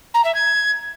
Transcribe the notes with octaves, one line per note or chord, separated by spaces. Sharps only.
A#5
E5
G#6